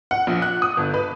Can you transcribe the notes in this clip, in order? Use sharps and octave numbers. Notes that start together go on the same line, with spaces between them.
F#5
A#1
F#6
D#6
G1
B4